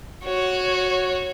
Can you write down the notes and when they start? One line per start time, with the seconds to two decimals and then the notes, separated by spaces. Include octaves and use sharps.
0.25 F#4 C#5